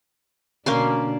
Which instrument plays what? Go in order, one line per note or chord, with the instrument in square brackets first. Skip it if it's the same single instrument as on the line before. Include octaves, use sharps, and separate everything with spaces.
[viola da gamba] B2 D3 D4 [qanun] A#3 C#4 C6